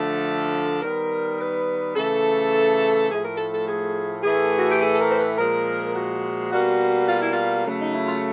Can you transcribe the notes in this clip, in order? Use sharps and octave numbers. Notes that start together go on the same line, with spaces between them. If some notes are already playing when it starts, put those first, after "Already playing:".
Already playing: D3 F3 A3 A4
D#3 G3 B3 A#4
B4
C#3 E3 A3 A4
A2 F3 A3 G#4
A#4
A4
A4
G#4
A2 E3 A3 G#4
F#4
G4
G#4
A4
A#4
C5
B4
A#2 F3 G#3 A#4
F#4
B2 G3 A#3 F#4
F4
E4
F4
C#3 F#3 A3
D#4
E4
F4